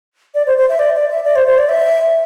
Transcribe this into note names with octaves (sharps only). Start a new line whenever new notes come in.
D5
C5
C5
E5
D5
D5
E5
D5
C5
C5
D5
E5